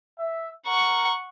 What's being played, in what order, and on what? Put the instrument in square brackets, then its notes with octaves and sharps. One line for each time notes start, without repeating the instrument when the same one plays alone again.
[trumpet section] E5
[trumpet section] A#4 A#5 [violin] F#5 C#6